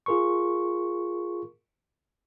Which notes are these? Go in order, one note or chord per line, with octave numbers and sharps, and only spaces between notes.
F4 G#4 A#4 C6 C#6